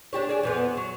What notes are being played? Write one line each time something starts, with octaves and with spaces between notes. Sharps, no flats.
D4 G4 C#5
G#4 D5
F2 E3 B3
F#3